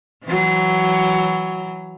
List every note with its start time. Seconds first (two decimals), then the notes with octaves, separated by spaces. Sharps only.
0.24 E3 F#3